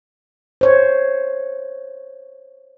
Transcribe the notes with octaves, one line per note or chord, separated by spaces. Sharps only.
C5 C#5